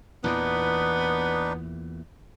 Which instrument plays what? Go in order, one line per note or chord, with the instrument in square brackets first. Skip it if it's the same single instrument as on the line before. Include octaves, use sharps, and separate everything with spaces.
[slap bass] E2 A#2 E3 [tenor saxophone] B3 [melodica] D4 D#4 B4